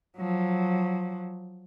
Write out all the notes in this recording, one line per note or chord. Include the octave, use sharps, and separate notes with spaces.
F3 F#3